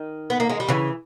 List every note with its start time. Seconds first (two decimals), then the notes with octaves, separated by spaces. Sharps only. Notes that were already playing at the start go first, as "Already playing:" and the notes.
Already playing: D#3
0.30 B3
0.40 A#3
0.49 G#3
0.60 G3
0.69 C#3 E3